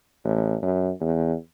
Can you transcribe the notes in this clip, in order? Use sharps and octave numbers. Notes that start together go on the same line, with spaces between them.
A1
F#2
E2